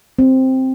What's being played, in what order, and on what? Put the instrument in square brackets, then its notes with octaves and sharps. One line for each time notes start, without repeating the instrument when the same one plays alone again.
[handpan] C4